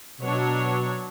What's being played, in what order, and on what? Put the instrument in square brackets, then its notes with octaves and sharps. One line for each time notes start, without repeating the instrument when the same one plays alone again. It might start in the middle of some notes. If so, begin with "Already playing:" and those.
[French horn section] B2 [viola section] F#3 D4 C#5